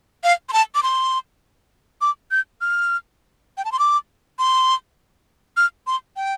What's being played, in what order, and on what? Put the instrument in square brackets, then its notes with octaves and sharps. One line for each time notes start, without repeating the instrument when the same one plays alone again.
[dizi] F5
C6
A5
D6
C6
D6
G6
F6
G5
A5
C6
D6
C6
F6
C6
G5